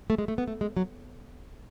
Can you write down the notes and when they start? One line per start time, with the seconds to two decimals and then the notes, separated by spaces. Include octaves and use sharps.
0.10 A3
0.18 G#3
0.28 A3
0.38 B3
0.48 A3
0.61 G#3
0.77 F#3